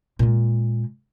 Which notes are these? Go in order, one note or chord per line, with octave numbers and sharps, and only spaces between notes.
A#2 G#3